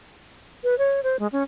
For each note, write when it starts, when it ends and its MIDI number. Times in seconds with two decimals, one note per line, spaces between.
0.64 0.77 71
0.78 1.01 73
1.03 1.17 72
1.19 1.27 56
1.32 1.43 61